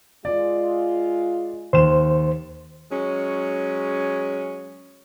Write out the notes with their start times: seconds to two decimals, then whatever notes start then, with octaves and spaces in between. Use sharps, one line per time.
0.25 G#3 F4 D5
1.73 D#2 C5 E7
2.92 F#3 G#3 C#4